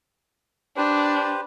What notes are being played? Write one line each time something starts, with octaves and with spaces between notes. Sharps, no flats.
D4 G4 B4 C5